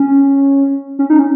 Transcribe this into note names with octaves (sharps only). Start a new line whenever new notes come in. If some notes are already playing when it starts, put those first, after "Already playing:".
Already playing: C#4
C#4
D#4
C#4